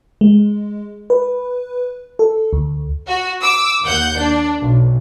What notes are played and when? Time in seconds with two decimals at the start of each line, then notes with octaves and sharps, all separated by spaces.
0.21 G#3
1.10 B4
2.19 A4
2.53 D2
3.07 F#4
3.41 D6 E6
3.84 D#2 F#5 G6
4.17 D4
4.61 B1